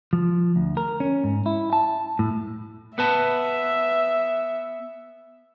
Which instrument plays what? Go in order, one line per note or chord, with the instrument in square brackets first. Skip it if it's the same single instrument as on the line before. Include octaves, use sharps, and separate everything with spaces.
[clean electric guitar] F3
D2
A#4
C#4
G#2
E4
A5
A2
[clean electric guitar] B3 B4 A5 [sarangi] E5